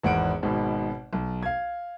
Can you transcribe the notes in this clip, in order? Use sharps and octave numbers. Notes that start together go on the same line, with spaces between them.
G#1 E2 F#5 D7
G#1 G#2 B2
B1
F5 G#6